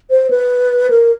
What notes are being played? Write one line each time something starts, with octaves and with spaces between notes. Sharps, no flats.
C5
B4
A#4